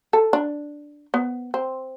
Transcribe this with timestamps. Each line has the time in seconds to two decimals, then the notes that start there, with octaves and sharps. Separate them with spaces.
0.13 A4
0.33 D4
1.14 B3
1.54 C4